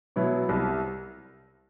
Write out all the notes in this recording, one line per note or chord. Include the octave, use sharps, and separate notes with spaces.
B2 F#3 B3 E4
C2